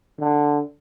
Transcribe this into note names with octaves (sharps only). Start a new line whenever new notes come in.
D3